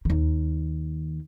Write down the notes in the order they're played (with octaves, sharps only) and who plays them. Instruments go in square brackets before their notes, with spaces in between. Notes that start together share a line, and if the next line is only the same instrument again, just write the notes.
[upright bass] D#2 D#3